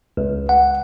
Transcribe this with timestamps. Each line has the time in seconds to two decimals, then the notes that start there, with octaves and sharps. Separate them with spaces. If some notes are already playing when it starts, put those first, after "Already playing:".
0.17 C#2
0.49 F#5